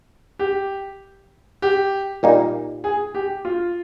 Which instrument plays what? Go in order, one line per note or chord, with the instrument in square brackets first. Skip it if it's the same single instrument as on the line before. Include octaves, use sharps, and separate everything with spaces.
[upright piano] G4
G4
[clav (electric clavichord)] A#2 G3 A#3 D#4
[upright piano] G#4
G4
F4